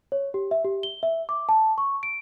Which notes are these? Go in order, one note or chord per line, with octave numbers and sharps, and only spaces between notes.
C#5
G4
E5
G4
G7
E5
D6
A5
C#6
D7